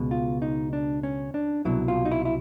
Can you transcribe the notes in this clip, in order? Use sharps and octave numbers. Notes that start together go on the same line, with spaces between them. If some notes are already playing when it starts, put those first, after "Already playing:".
Already playing: C#2 B2 G#3 B3
F4
D#4
D4
C#4
D4
C2 B2 F#3 E4
F4
D#4
E4
E4